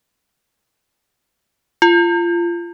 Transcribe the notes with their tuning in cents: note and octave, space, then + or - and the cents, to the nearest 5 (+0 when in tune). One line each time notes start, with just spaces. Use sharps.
F4 -25